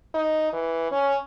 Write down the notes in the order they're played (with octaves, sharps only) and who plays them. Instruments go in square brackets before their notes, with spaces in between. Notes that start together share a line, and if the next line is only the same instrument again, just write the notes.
[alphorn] D#4
E3
C#4